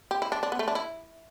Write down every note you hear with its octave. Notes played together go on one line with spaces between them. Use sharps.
G4
E4
D4
D4
B3
A3
D4
E4